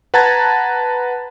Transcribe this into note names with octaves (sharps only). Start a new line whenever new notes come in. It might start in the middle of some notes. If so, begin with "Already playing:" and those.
B4 F#5 A5 A#5 G#6 A6